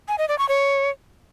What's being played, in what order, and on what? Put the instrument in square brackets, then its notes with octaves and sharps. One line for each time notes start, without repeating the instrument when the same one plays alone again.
[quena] G#5
D#5
D5
C#6
C#5